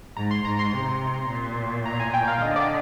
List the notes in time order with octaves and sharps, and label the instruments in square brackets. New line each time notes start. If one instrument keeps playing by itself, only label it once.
[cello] G#2 [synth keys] A#5
[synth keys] C6
[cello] G#2 [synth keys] A#5
[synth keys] C6
[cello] C3
A#2
[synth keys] A#5
G#5
G5
F5
[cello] D3 [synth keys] D#5
[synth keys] D5